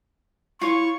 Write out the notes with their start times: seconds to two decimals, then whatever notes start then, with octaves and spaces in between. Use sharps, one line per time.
0.61 E4 F4 C#5 C#6